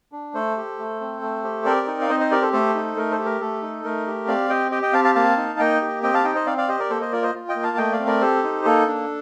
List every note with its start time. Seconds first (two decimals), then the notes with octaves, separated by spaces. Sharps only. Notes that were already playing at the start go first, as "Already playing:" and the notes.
0.12 D4
0.34 A3 A4 C5
0.57 G4
0.79 A3
1.01 C4
1.22 A3
1.44 G4
1.65 C4 A#4 D5
1.87 D#4
2.01 F5
2.09 C4 C5 D#5
2.20 C5 D#5
2.31 G4 A#4 D5
2.42 A4 C5
2.53 A3 A4 C5
2.75 D#4
2.97 A3 A#4
3.11 A4 C5
3.19 G4
3.26 A#4
3.41 A3 A4
3.62 D#4
3.84 A3 A#4
4.07 G4
4.27 C4 D5 F5
4.49 G4 D#5 G5
4.71 G4 D#5 G5
4.82 D#5 G5
4.93 C4 F5 A5
5.04 F5 A5
5.15 A#3 F5 A5
5.37 D#4
5.59 A#3 D#5 G5
5.82 G4
6.03 C4 D#5 G5
6.14 F5 A5
6.24 D#4 D#5 G5
6.35 C5 D#5
6.46 C4 D5 F5
6.58 D5 F5
6.68 G4 C5 D#5
6.80 A#4 D5
6.90 A#3 A4 C5
7.01 C5 D#5
7.12 F4 A#4 D5
7.23 C5 D#5
7.35 F4
7.49 D#5 G5
7.56 A#3
7.63 F5 A5
7.77 A3 D#5 G5
7.92 D5 F5
8.00 C4
8.07 A#4 D5
8.21 G4 A4 C5
8.43 D#4
8.65 A#3 A4
8.87 D4